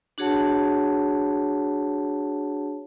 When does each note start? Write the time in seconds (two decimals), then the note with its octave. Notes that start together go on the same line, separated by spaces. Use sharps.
0.18 D4 F#4 G#4 C#5 F#5 A5